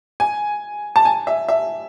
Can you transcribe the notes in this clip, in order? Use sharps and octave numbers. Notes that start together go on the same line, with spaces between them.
G#5
A5
G#5
E5
E5